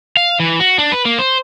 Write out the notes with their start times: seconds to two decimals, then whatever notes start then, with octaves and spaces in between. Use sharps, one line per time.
0.17 F5
0.40 E3
0.60 F#4
0.78 D4
0.92 B4
1.05 A#3
1.19 C5